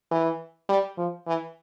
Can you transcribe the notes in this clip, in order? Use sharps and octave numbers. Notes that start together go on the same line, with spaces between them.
E3
G3
F3
E3